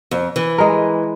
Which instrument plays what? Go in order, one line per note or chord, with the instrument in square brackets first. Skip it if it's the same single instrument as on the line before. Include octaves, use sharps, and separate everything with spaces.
[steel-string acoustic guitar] F2
E3
[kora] G#3 A#4